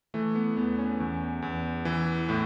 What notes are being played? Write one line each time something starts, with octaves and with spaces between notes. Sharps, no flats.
E3 A3
B3
E2 B3
C#4
E2
E2
E3
A2